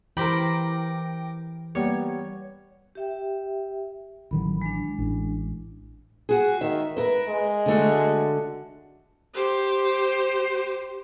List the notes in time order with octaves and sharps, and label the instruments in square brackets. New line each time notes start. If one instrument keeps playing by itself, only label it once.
[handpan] E3 G4 [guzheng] A#4 C5 B5 [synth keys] G5 D6 A#6
[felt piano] G3 A#3 B3 [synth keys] C#5
[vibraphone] G4 E5 G5
[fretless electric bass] A1 D#3 F#3 [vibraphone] B5
[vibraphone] G#3 D4
[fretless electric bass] A1
[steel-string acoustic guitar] F#4 G#4
[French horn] D#3 [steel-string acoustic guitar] E5
[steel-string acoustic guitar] A#4 E5 [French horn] B4
[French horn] G#3
[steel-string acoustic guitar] D3 A3 F#4
[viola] G4 C5